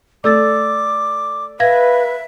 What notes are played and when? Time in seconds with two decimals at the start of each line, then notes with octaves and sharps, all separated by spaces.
0.24 A3 D5 D6 E6 A6
1.60 B4 E5 F5 G#6 A#6